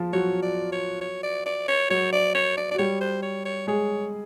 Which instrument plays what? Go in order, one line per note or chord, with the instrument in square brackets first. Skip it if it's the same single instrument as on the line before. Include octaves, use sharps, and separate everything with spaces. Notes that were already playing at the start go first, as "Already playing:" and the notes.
Already playing: [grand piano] F3 F4
[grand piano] F#3 F#4 [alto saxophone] C#5
[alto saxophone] D5
C#5
C#5
D5
D5
C#5
[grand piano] F#3 F#4 [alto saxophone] C#5
[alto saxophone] D5
C#5
D5
D5
[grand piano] F#4
[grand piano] G3 G4 [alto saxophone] C#5
[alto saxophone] C5
C#5
C#5
[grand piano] G#3 G#4 [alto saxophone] C#5